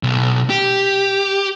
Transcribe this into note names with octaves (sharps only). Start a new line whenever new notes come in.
B1
G4